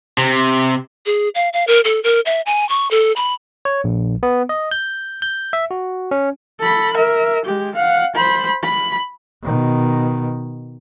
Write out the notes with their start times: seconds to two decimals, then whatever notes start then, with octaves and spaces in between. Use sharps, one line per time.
0.18 C3
1.06 G#4
1.35 F5
1.53 F5
1.67 A#4
1.85 A4
2.04 A#4
2.26 E5
2.46 G#5
2.69 C#6
2.91 A4
3.16 B5
3.65 C#5
3.84 A#1
4.23 B3
4.49 D#5
4.71 G6
5.22 G6
5.53 E5
5.71 F#4
6.11 C#4
6.60 A4 B5
6.94 A#4 E5
7.45 G#3 G4
7.76 F5 F#5
8.16 C5 B5
8.64 B5
9.43 B2 D#3